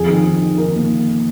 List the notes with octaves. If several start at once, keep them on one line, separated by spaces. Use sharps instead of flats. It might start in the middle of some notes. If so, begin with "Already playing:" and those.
Already playing: F2 G#4
D#3
D#3
D#3
D#3 A#4
A#3